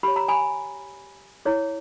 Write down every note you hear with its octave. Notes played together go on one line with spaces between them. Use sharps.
G4 C#5 B5
A#5
G#5 B5
E4 G#4 C#5